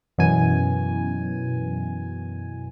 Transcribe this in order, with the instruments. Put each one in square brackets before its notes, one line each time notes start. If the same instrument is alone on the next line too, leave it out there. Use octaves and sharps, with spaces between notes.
[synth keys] F#2 B2 E3 G#5